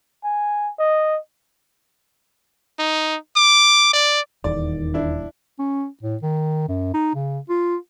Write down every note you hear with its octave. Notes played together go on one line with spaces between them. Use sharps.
G#5
D#5
D#4
D6
D5
D#1 E2 D#3 D5
D4 E4
C#4
A2
D#3
F#2
D#4
C#3
F4